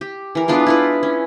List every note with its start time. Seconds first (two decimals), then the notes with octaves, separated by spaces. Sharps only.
0.01 G4
0.35 E3 A#4
0.48 G#3 B3 D4 F4
0.67 E4 F4 B4
1.03 C#4